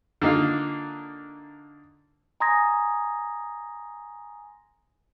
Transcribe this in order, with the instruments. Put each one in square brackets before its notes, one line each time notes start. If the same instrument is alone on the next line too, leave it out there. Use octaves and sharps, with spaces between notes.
[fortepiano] D3 A#3 D#4 F4
[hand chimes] G#5 A#5 C6 D#6 G#6 A#6